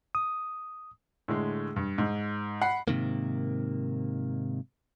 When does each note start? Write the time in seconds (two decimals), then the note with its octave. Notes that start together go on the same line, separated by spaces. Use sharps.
0.15 D#6
1.28 A2 D3 G#3
1.76 G2
1.98 G#2
2.62 F#5 B5 C7
2.88 G#2 C3 D#3 A#3